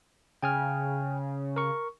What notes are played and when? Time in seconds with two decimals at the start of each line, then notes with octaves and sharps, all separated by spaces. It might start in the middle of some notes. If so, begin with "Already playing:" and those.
0.43 C#3 G5 G#5 F6
1.56 A#4 C#6